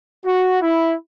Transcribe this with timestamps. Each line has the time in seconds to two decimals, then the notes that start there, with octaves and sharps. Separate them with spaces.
0.25 F#4
0.62 E4